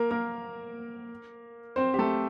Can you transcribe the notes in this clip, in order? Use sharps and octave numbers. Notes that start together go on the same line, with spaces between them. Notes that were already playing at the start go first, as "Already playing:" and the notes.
Already playing: A#3 A#4
A#3 A#4
C4 C5
G4
A3 A4